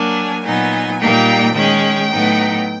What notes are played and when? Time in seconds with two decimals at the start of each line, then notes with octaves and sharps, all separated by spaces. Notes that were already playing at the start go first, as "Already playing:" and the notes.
Already playing: F#3 A#3 D4 G#5
0.44 A#2 F#3 B3 D#4 G#5
1.00 A#2 G3 A#3 D#4 G5
1.55 D#3 G#3 C#4 G5
2.11 A2 F#3 B3 D#4